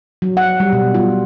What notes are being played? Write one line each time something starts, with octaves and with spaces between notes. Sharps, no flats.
F#3
F#5
G3
B2
F4